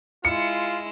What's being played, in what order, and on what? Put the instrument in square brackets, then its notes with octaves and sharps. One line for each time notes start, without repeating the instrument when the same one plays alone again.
[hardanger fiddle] G#3 E4 [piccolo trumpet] F4 [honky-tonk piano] C#7